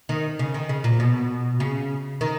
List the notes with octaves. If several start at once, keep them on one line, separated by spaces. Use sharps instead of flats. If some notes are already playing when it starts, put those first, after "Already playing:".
D#3
C#3
D#3
C#3
A#2
B2
C#3
D#3